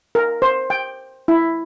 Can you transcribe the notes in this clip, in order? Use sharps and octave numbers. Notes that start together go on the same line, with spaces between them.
A#4
C5
G5
E4